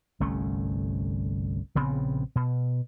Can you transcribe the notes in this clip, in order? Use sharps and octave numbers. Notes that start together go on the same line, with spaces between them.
G1 C2 A3 C#4
A#1 C#3 B3 C4
B2